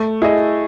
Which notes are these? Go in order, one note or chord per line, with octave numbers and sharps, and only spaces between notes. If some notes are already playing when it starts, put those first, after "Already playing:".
Already playing: A3
E4 G#4 D#5